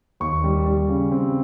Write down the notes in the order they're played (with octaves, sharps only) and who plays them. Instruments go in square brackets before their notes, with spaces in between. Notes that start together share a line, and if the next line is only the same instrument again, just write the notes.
[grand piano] D#2 C#6
G3
G3
C#3
C4